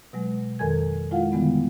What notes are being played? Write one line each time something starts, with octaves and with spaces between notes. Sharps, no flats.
B2 F#3 G#3
F2 D#3 A4 A#4 G#5 G#6
G#3 E4 F4 F5 F#5
D3 D#3 G3 G#3 B3